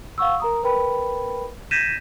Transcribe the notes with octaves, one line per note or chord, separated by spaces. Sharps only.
F5 F#5 C#6 E6
A#4 A#5 D#6
A#4 B4 G5 B5
G6 G#6 A#6 B6 D#7 E7